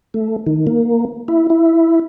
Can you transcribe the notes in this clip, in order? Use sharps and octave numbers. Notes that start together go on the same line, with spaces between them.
A3
D#3
A#3
E4
E4